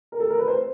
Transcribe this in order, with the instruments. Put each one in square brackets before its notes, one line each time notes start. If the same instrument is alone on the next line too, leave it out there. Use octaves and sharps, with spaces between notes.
[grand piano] A#4
A4
A#4
B4
C5